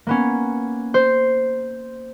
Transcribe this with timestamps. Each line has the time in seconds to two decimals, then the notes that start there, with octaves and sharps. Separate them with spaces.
0.07 A#3 B3 C#4
0.94 C5